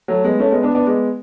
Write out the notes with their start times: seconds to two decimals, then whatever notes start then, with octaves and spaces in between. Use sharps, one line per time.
0.08 F#3 A3
0.24 G#3 B3
0.40 A3 C#4
0.51 G#3 B3
0.63 B3 D4
0.75 B3 D4
0.87 G#3 B3